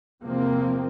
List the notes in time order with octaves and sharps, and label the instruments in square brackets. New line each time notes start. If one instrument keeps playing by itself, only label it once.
[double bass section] E2 C3 F3 A#3 C4